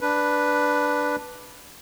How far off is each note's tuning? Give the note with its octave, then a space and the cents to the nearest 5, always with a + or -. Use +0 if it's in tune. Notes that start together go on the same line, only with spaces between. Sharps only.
D4 +0 B4 +0